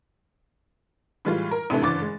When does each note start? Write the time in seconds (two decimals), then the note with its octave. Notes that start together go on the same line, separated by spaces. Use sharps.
1.25 A2 E3 G3 G#3 F4
1.51 A#4
1.70 A1 C3 E3 A3 D4
1.82 F#1 G2 E3 D6 A6
2.02 G#3